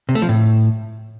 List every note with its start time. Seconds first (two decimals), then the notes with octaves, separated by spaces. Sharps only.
0.09 C3
0.15 A3
0.22 F3
0.29 A2